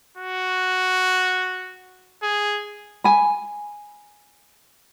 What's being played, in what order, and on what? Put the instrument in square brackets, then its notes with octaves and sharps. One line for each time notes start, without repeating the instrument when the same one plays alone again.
[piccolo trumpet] F#4
G#4
[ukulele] G#5 B5